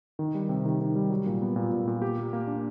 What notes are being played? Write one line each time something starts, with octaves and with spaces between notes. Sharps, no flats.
D#3
G3
C3
D#3
D#3
G3
F#3
A#2
B3
A#2
A#2
A#2
G4
A#3
A#3
D4